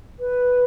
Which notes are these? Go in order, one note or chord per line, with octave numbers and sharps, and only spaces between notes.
B4